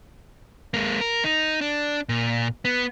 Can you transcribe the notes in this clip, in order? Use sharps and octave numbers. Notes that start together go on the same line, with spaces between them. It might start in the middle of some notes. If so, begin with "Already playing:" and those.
G#3 A#3
A#4
D#4
D4
A#2
B3